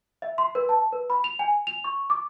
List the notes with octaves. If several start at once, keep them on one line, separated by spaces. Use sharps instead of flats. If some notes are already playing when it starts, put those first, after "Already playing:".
E5
C6
B4
A5
B4
B5
F7
G#5
F7
C#6
D6